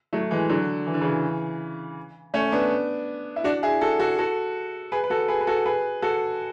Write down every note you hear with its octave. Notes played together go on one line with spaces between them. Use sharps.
F#3 A3
E3 G#3
D3 F#3
E3
D3
C#3 E3
A3 C#4
B3 D4
E4
D4 F#4
E4 G#4
F#4 A4
F#4 A4
F#4 A4
G#4 B4
B4
F#4 A4
G#4 B4
B4
F#4 A4
G#4 B4
F#4 A4